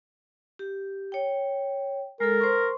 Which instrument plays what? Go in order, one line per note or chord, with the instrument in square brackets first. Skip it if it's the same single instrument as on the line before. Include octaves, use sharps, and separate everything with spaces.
[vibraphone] G4
C#5 G5
[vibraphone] G#3 A4 [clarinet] A#4
[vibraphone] C5 C6 C#6